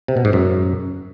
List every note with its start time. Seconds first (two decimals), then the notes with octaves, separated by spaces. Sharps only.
0.08 C3
0.17 B2
0.25 G#2
0.33 F#2